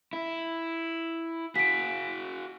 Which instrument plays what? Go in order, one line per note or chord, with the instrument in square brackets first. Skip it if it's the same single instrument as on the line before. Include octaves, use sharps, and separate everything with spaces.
[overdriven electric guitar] E4
[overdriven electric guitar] F#4 G#4 [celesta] B6 D7